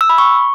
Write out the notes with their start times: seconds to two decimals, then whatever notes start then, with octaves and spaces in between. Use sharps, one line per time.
0.01 E6
0.10 B5
0.18 C#6